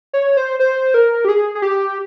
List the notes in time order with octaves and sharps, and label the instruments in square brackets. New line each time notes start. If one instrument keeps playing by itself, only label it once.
[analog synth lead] C#5
C5
C5
A#4
G4
G#4
G#4
G4